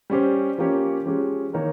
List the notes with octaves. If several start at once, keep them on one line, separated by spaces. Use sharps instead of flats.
G3 C#4 G4 C5
F3 A#3 C#4 G4 C#5
F3 G#3 C#4 G4
D#3 A#3 D#4 A#4 C#5